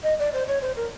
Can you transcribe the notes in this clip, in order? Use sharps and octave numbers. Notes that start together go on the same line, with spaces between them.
D#5
D5
C5
C#5
C5
A#4